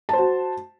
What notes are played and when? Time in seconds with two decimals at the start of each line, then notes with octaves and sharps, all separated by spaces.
0.09 A5
0.13 C5
0.18 F#4